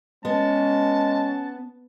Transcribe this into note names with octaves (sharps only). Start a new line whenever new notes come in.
G#3 B3 C#4 A5